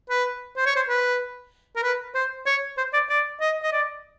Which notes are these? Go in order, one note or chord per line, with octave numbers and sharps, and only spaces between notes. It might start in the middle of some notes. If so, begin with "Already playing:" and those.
B4
C5
C#5
C5
B4
A#4
B4
C5
C#5
C5
D5
D5
D#5
D#5
D5